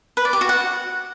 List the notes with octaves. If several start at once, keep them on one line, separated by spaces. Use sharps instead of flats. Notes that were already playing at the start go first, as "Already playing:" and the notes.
B4
D5
G4
F#4
F#5